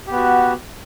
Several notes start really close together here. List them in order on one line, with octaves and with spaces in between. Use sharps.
G4 B3 F#4